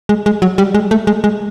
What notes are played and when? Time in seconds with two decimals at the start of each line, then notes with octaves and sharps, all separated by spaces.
0.09 G#3
0.26 G#3
0.42 F#3
0.58 G3
0.74 G#3
0.91 A3
1.07 G#3
1.24 G#3